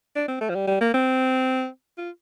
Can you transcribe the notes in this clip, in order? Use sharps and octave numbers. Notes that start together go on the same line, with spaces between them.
D4
C4
A3
F3
G3
G3
A#3
C4
F4